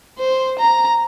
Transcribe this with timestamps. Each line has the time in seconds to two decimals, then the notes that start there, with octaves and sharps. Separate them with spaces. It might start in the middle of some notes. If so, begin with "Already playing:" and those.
0.19 C5
0.59 A#5